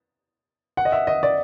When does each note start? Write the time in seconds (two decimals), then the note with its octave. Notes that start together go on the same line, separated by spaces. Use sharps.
0.77 F#5
0.85 D#5
0.92 E5
1.07 D#5
1.23 D5